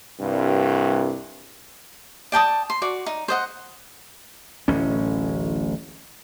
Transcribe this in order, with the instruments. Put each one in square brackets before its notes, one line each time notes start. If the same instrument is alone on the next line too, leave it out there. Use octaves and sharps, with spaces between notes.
[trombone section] C2 G2
[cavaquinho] D5 G5 A5 D#6
C6
F#4 D5
D#4
C5 D#5 F#5
[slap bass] D1 A1 C#4